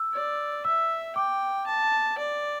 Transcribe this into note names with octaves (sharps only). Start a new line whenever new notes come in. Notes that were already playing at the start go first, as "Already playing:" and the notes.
Already playing: E6
D5
E5 E6
G5 D6
A5
D5